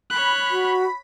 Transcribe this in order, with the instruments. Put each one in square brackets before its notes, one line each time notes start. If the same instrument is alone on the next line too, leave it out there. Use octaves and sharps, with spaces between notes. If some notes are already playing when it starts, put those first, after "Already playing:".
[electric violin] C#5 F#6 [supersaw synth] B5
[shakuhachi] F#4